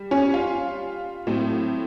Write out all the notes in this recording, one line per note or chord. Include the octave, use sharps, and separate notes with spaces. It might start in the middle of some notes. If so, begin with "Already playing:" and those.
Already playing: G3
C#4
F4
A2 F#3 A3 C4